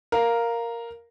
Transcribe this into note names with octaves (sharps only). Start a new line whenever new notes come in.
A#4 F5